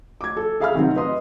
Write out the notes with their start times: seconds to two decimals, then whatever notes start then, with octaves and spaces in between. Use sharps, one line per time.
0.21 D6 G#6
0.37 A4
0.60 G#4 E5 F5 G#5 B5 F6
0.74 C3 D#3 F#3 C4
0.96 B4 D#5 C6 D#6